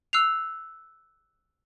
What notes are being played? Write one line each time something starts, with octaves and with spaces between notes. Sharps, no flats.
E6 F#6 C7 F7